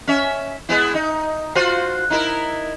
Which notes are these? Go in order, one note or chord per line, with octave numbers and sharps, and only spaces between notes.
C#4 E5
G#3 B3 E4
D#4
F4 F#4 C5
D#4 E4 A#4